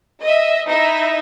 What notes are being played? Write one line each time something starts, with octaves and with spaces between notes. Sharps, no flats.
D#5 E5
D#4 E4 D#5 E5